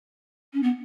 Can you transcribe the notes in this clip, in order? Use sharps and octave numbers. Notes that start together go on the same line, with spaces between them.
C#4
B3